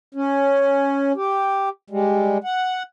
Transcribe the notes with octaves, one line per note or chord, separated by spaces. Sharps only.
C#4
G4
G3 G#3
F#5